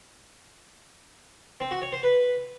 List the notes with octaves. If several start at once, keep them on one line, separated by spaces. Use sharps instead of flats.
C4
F#4
C#5
C5
B4